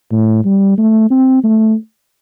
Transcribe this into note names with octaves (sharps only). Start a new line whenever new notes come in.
A2
G3
A3
C4
A3